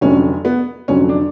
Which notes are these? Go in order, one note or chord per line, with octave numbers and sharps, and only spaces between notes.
F1 F2 D3 F#3 C#4
B3
F1 F2 D3 F#3 C#4
D4